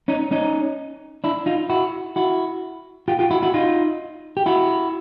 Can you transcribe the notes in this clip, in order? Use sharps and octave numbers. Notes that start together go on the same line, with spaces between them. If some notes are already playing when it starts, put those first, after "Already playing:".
C#4 D#4
C#4 D#4
D4 E4
D#4 F4
E4 F#4
E4 F#4
F4 G4
F4 G4
E4 F#4
E4 F#4
D#4 F4
G4
E4 F#4